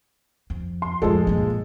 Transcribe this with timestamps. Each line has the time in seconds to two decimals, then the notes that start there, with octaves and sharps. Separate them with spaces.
0.50 F2
0.82 C6
1.02 F2 A2 F3 G#3 A4
1.27 G2 A#2